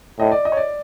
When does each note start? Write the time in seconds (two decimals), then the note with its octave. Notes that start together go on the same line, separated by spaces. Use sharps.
0.19 A2 D#5
0.32 D5
0.45 D#5
0.52 C#5
0.57 D5